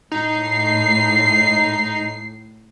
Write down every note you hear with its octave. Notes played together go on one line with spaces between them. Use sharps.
A2 D#4 C7